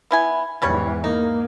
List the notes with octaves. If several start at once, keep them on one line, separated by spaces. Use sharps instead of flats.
B3 E4 G#5
E2 G#2 C#3 E3 G3 C#5
A#3 D#4